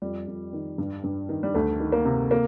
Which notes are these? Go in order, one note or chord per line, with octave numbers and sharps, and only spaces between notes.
F2 G3
F2
D#3
G2
G2
D#3
G3
D2 A3
D#3
A#3
C3
A#3